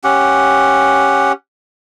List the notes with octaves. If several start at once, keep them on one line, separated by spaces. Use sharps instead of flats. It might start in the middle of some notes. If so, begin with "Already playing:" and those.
C#4 G4 F#5